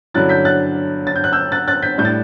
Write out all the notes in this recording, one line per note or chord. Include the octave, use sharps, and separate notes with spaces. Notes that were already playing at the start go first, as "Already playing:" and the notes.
G2 D3 F#3 C#4 E4 F#6 A6
G6 B6
F#6 A6
A6
G6
F#6
E6 G6
F#6 A6
F#6 A6
G6 B6
A2 G3 D4 G6
A6